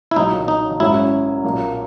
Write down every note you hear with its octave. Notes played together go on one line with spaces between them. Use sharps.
E4
B1 A#2 F#3 D#4
D#4
G#1 G#2 F#3 C#4 E4
B1 A#2 A#3